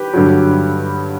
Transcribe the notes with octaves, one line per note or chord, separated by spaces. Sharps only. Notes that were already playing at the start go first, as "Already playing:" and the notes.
Already playing: G4 B4
G2 D3 F#3